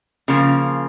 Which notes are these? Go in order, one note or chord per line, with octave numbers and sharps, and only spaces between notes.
C#3 F3 A#3